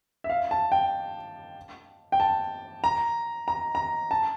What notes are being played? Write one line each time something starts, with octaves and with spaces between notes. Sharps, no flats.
E5
F5
A5
G5
G5
A5
A#5
A#5
A#5
A5